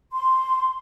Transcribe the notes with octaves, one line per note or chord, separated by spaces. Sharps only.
C6